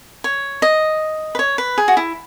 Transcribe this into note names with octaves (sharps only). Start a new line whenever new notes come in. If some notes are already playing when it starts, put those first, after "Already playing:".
C#5
D#5
B4
C#5
B4
G#4
F#4
E4